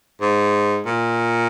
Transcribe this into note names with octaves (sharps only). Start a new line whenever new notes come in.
G#2
A#2